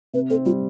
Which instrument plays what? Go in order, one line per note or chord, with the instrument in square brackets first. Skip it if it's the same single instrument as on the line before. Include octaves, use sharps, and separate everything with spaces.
[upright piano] C3 [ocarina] B4
[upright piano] C4 [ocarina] A4
[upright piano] G3 [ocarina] F4